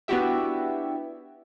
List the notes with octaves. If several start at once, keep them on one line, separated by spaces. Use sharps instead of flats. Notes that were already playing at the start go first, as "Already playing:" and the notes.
B3 D4 E4 F#4 G4 E5